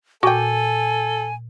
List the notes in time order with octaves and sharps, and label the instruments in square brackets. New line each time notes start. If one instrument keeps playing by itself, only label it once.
[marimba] A#2 G6 [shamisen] F#4 G5 [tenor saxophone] A4 [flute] G#5